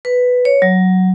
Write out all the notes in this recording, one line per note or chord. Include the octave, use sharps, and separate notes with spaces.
B4
C#5
F#3